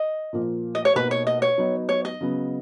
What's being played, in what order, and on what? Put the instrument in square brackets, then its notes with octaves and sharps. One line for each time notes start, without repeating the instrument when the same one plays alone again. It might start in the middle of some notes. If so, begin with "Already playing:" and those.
Already playing: [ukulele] D#5
[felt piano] A#2 F3 A#3
[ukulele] D#5
C#5
[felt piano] B2 A#3 D#4 [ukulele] B4
[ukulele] C#5
D#5
C#5
[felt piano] F#3 B3 D#4
[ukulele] C#5
D#5
[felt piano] C#3 F#3 B3